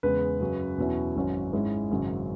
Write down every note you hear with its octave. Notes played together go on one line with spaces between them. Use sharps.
E2 C#3 G#3 B4
F#2 C#3 F#3
E2 B2 F#3 C#4 E4
G#1 F#2 F#3 C#4
G#2 G#3 C#4 E4
G#1 F#2 C#3 F#3